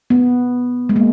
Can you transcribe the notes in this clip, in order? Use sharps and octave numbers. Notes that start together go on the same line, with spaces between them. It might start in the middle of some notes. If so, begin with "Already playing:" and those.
B3
G#3
A#3